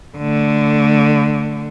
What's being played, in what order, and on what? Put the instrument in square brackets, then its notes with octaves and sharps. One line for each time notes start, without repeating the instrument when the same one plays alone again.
[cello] D3 A3